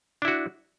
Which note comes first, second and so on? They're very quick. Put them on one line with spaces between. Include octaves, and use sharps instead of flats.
D4 E4 F#4